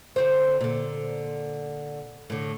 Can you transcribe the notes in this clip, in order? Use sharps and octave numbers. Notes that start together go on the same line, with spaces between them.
D3 C4 C5
A#2 D3
A2 D3